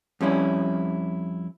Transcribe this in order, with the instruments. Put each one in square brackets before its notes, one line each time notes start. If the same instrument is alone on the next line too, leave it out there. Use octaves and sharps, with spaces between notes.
[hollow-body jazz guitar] F2 G3 C#4 E4